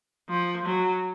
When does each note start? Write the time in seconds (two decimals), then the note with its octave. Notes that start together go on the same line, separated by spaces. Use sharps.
0.29 F3
0.66 F#3